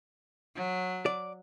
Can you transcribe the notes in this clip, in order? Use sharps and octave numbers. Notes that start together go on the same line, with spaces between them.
F#3
D5